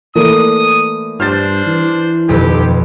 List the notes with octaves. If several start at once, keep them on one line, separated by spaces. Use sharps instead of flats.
E3 A3 A#3 A#4 D5 D#6
G2 D4 C5 F6 A6
E3
D#1 B1 F2 G4